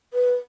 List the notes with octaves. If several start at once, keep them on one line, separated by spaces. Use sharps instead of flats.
B4